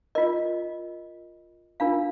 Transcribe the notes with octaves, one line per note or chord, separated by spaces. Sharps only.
F4 A#4 D#5
D4 F4 A#4 F5